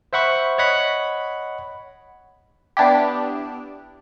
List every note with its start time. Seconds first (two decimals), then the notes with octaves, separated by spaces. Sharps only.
0.13 C5 E5 F#5 B5 C#6
0.58 C#5 D#5 F#5 B5
2.77 B3 D4 E4 G4